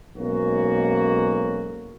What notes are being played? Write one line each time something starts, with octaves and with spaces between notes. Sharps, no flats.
B1 G#2 A#3 C#4 D#4 F#4